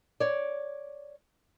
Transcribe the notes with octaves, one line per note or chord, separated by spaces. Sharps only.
C#5 D5